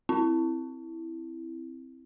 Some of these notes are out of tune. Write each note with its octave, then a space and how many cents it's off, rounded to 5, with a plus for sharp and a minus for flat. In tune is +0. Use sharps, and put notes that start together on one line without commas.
C4 +0 E4 +0